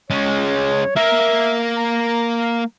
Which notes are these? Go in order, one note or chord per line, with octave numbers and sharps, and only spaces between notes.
G#3 C#4 C#5
A#3 A#4 E5
A#5